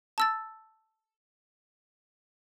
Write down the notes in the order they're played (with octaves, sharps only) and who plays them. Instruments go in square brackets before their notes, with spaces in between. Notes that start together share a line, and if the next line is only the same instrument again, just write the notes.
[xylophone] A5 E6 A6